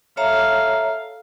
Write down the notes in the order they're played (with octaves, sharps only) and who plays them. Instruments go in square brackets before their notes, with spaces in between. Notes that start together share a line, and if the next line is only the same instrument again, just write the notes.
[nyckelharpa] A4 F5 [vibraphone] C#5 E5 A#5